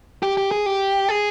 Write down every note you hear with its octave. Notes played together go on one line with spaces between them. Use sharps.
G4
G4
G#4
G4
G#4